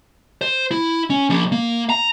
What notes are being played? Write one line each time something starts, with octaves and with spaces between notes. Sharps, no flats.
C5
E4
C#4
F3 A#3
A#3
A#5